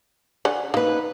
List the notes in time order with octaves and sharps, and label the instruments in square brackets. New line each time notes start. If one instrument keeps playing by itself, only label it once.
[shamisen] D3 C#4
[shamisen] A#3 [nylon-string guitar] D#4 B4